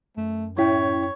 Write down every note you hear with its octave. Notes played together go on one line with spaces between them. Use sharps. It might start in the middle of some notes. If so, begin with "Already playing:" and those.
F#2 A3
A2 C#4 E4 C#5 G5